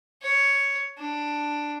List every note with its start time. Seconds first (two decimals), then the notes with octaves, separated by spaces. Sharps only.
0.23 C#5
0.98 D4